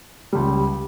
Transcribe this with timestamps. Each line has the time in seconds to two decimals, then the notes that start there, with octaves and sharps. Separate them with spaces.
0.33 C#2 C#3 G3